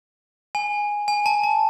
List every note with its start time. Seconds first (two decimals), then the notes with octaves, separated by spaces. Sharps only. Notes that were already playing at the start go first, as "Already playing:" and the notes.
0.55 G#5
1.08 G#5
1.26 A5
1.43 A5